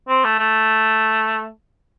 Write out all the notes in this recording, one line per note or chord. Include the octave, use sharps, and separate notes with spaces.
C4
A3
A3